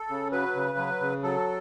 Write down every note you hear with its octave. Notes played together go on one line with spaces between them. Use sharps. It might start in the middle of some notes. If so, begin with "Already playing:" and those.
Already playing: A4
C#3
F#3 B4
C#3
F#3
C#3
F#3 A4